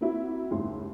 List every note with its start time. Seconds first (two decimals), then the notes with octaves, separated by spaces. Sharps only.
0.01 A#3 C4 E4 F#4
0.50 F#1 D#2 G#2 E4 C6